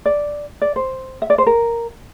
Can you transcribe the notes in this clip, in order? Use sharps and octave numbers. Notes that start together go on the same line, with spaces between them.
D5
D5
C5
E5
D5
C5
A#4